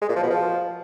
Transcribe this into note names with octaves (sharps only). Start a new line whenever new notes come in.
G#3
A#2
F3
B2
F3